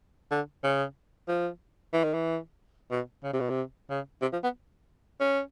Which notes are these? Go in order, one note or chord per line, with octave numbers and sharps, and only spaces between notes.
D3
C#3
F3
E3
D#3
E3
B2
C#3
C3
B2
C3
C#3
C3
F3
B3
C#4